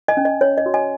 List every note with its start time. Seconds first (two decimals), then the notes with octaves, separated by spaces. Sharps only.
0.08 D#5 G#5
0.17 C#4
0.25 D#5
0.41 C#5
0.58 D#5
0.66 F#4
0.74 D#5 G#5